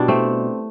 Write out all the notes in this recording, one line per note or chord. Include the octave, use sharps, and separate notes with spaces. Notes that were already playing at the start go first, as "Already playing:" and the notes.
Already playing: B2 G3 D4 E4
A3 C4